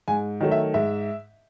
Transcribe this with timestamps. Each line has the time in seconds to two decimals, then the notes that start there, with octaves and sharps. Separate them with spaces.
0.08 G#2 G#5
0.41 D#3 F#3 A3
0.51 E5
0.74 G#2 E5